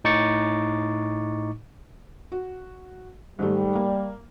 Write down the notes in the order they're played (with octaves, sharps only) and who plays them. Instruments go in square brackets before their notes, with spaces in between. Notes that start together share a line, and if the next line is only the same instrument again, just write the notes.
[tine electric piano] A2 D#4 C#6 D6 A6 C#7
[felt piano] F#4
[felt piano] G#2 D#3 A3 [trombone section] G3
[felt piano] A#3